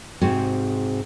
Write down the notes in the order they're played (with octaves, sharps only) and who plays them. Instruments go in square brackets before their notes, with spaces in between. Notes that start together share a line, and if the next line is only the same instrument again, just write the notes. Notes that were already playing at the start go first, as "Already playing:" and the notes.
[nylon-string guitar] G#2 C3 G#3 C4 F#4